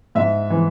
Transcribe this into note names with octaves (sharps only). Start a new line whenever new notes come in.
G#2 E5
E3